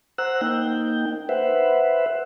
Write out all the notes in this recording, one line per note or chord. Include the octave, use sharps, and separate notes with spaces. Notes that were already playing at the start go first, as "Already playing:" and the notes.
C5 F#5 A#5 E6 F#6
A#3 D#4 G5
B4 C5 E5 F#5